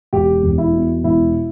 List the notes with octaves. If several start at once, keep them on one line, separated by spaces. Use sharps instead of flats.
E1 G4
E2
E4
B2
E1 E4